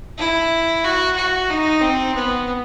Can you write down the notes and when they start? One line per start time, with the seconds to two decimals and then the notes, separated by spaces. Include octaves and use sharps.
0.18 E4
0.84 F#4
1.16 F#4
1.50 D#4
1.81 C4
2.15 B3